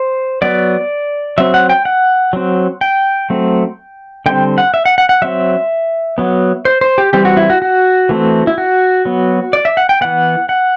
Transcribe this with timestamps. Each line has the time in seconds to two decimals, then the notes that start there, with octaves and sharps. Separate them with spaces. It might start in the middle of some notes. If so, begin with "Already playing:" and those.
Already playing: C5
0.42 F#3 B3 D5
1.38 F#3 C4 E5
1.54 F#5
1.69 G5
1.85 F#5
2.33 F#3 C4
2.81 G5
3.30 F#3 A3 C4
4.26 D3 G3 C4 G5
4.58 F#5
4.74 E5
4.85 F#5
4.98 F#5
5.09 F#5
5.22 F#3 C4 E5
6.18 F#3 B3
6.65 C5
6.81 C5
6.98 G4
7.13 E3 G3 C4 G4
7.25 F#4
7.37 E4
7.50 F#4
7.62 F#4
8.09 E3 A3 C4
8.47 E4
8.58 F#4
9.05 F#3 B3
9.53 D5
9.65 E5
9.77 F#5
9.89 G5
10.01 E3 B3 F#5
10.49 F#5